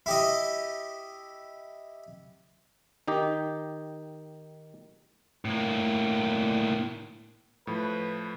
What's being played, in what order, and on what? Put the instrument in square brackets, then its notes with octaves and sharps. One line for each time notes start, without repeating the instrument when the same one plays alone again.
[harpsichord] E4 G4 D#5
[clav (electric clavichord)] D#3 D#4 G4
[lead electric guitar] A2 A#3
[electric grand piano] A2 F3 [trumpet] B4